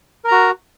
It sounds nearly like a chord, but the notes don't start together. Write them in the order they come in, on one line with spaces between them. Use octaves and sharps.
A#4 A#5 F#4